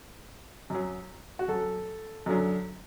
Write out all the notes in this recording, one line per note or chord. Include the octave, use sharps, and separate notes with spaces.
F#2 F#3
F#4
F#2 F#3 A4
F#2 D3 F#3